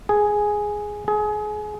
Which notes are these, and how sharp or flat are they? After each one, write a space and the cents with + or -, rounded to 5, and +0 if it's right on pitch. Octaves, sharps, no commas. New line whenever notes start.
G#4 +0
G#4 +25